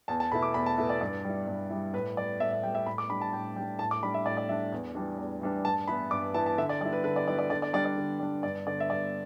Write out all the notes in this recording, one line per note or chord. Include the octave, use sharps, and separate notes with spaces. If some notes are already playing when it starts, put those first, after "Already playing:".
E2 A5
A5
B2 A3 E4 B5
D6
E2 B5
A5
B2 A3 E4 B4
D5
G2 D5
G3 E4
G2
G3 E4
A2 B4
G3 B3 D5
A2 E5
E5
G3 B3 G5
E5
A2 B5
D6
G3 D4 B5
A5
A2 G5
G3 D4 G5
A2 A5
D6
G3 D4 B5
E5
A2 D5
D5
G3 D4 E5
E2
E3 G3 D4
E2
E3 G3 D4
G2 A5
E3 B3 E4 B5
G2 D6
E3 B3 E4 A5
A5
D3 E5
D5
G3 B3 E4 D5
B4
D3 B4
D5
G3 B3 E4 D5
D5
D3 D5
D5
G3 D4 D5
D5
D3
G3 D4
G2 D5
D3 B3 D5
E5
G2 D5